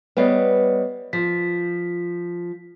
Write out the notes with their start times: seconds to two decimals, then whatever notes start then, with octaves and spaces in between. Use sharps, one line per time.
0.17 G3 B3 B4 C#5 D#5 F5
1.13 F3 B6